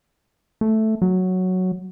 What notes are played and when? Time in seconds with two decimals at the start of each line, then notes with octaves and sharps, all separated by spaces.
0.61 A3
1.02 F#3